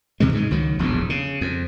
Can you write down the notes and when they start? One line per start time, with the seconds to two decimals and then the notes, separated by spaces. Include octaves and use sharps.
0.20 D2 C3 E3 G#3
0.33 G#2 C#3 G3 G#3
0.51 C#2 D#3 F#3
0.79 E1 A#1 E2 A2
1.10 C#3
1.41 F2